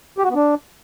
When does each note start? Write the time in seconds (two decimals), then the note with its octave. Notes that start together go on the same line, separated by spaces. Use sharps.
0.18 G4
0.24 F#4
0.30 B3
0.35 D4